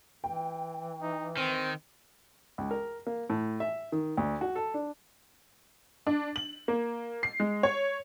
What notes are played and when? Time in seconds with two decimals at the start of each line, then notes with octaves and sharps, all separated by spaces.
0.24 E3 G5
1.02 D#4
1.37 D#3 C4
2.58 C#2
2.71 A#4
3.07 A#3
3.30 A2
3.60 E5
3.92 D#3
4.17 D2
4.41 F#4
4.55 A4
4.74 D4
6.07 D4
6.36 F#7
6.68 A#3
7.23 C7
7.40 G#3
7.63 C#5